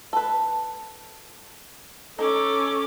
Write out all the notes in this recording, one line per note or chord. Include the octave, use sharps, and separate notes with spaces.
A4 B4
C#4 D#4 A4 D6